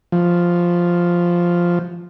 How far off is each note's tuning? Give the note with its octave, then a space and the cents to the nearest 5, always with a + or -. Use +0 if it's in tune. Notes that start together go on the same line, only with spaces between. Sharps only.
F3 +0